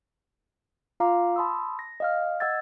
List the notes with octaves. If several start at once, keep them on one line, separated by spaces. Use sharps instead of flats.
F4 F5 A#5 D6
A5 B5 C6 D#6 E6
A#6
D#5 F5 F6
D#5 F#5 E6 G#6 A6